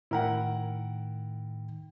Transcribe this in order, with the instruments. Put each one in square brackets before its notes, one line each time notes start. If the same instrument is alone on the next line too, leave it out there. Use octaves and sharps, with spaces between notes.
[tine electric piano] A2 D#3 G5 [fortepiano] E4 A#4 F#5